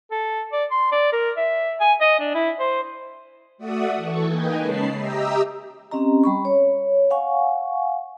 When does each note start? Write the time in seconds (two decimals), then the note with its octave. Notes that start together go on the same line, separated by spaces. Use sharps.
0.11 A4
0.52 D5
0.71 C6
0.92 D5
1.13 A#4
1.37 E5
1.80 G#5
2.01 D#5
2.19 D4
2.35 E4
2.59 C5
3.58 A3 F#4 D5 E5 F#5 D#6
3.95 E3 A4 C#6
4.25 A#3 D#4 B4 D#5 G5 G#5
4.58 C#3 G#3 C#4 A5 B5 C7
4.97 G4 D#5 E5 G5 A#5 E6
5.91 C4 C#4 G4 D#5 A#5
6.24 G3 B5 C#6
6.45 C#5
7.11 F5 F#5 G#5 C#6